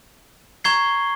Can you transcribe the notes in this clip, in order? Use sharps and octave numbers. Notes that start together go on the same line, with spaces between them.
A#5 C#6 G#6 C7 G7